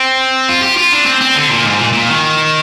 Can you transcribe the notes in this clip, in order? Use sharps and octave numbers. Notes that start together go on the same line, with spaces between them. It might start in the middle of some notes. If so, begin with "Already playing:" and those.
Already playing: C4
F4
G4
F4
D4
C4
C4
D3
A#2
G#2
A#2
A#2
D#3